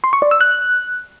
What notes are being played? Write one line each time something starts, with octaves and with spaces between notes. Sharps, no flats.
C6
C#6
D5
E6
F#6